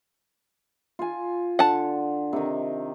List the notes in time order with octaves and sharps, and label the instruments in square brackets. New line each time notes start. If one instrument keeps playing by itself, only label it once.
[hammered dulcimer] F4 G#5
[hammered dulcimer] D3 [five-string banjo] F#5 A5
[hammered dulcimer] C3 D#3